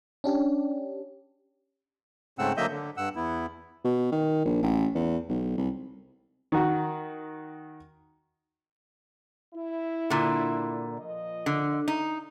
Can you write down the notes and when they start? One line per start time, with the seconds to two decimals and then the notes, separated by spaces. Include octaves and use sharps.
0.24 C#4 D4 G4
2.39 G#2 C#3 A3 C4 F#5 E6
2.57 D3 F#3 A#3 D#5 E5 G6
2.71 D3
2.97 G2 F#5 E6
3.16 E2 B3 E4
3.85 B2
4.12 D#3
4.46 A#1
4.63 A1
4.95 E2
5.29 B1
5.58 C2
6.52 D#3 F#4
9.54 E4
10.10 A#2 D3
10.97 A#2 F3 D#5
11.46 D3
11.88 D#4